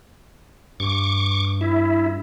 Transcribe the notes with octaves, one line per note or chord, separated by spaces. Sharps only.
G2 C#6 D6
E4